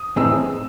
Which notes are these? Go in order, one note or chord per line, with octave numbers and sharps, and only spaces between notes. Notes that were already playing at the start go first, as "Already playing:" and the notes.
Already playing: D#6
A2 E3 C4 D#4 G#4 E6